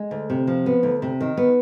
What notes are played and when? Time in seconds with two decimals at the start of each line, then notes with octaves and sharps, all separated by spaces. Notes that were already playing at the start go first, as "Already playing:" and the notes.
Already playing: G#3
0.11 D2
0.30 C3
0.47 F3
0.66 B3
0.83 D2
1.02 C3
1.21 D#3
1.37 B3